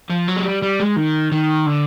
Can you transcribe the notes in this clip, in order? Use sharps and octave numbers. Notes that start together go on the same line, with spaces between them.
F3
F#3
G#3
G3
G3
G#3
D#3
D#3
D3